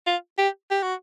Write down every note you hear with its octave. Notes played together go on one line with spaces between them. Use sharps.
F4
G4
G4
F#4